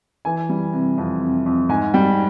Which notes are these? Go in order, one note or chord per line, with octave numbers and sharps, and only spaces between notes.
E3 G#5
G3
C3
F2
C3
F2
G#2 G#5
G3 G5